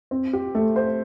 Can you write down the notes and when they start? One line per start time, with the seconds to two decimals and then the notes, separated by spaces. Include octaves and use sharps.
0.11 C4
0.33 G4
0.55 A3
0.76 C5